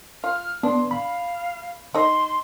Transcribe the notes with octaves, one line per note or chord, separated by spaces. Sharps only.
F4 F6
B3 D4 C6
F5 B5
D#4 D#5 C6